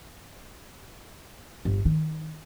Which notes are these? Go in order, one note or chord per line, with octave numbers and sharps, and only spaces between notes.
G1
D#3